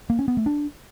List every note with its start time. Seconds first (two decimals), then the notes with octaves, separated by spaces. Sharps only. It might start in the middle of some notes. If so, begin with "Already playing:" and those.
0.10 A#3
0.19 C#4
0.28 B3
0.37 A3
0.46 D4